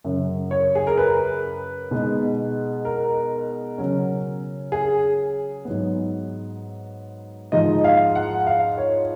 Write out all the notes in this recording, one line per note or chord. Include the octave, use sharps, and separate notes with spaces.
F#2 C#3 F#3
C#5
G#4
A#4
B4
B2 G#3 B3 D#4
A#4
C#3 F#3 C#4
G#4
G#2 F#3 B3
G#2 F3 G#3 D#4 D#5
F5
F#5
F5
C#5